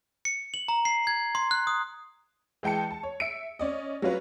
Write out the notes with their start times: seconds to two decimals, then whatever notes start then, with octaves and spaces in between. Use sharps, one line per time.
0.25 C#7
0.54 F#7
0.68 A#5
0.85 C7
1.07 G#6
1.35 C6
1.51 F#6
1.67 D#6
2.63 E3 G#3 G5 A5 C#7
2.91 A5
3.03 C#5
3.20 E5 C#7 D7
3.59 C#4 D5 D#5
4.02 F#3 G3 C#4 F4 B4